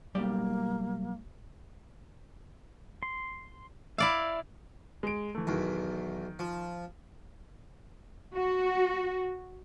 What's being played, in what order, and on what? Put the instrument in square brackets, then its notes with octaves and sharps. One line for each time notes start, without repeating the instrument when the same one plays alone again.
[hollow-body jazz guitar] B1 G3 D5 [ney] A#3
[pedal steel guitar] C6
[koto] E4 D5 F5 [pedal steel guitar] E5
[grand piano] G#3 D7
E3 A3
[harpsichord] B1 E2 [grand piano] D#3
[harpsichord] F3
[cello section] F#4